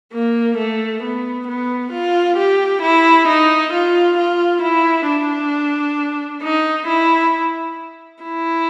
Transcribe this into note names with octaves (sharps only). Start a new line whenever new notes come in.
A#3
A3
B3
B3
F4
G4
E4
D#4
F4
F4
E4
D4
D#4
E4
E4